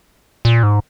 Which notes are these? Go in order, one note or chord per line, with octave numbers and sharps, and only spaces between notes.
A#2
G#2